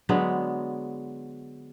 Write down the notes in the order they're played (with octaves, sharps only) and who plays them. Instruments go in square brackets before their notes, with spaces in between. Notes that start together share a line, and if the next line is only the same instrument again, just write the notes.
[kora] D3 F#3 G#3 B3